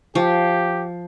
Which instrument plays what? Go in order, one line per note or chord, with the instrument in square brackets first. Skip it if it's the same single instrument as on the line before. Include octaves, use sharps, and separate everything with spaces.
[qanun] F3 [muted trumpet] G4